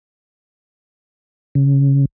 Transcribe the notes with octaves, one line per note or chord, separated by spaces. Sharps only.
C#3